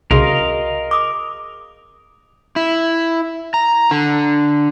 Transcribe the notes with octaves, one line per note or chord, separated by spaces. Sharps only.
C2 C#3 F#4 G#4 A#4 D#5 F5
D6 D#6
E4
A#5
D3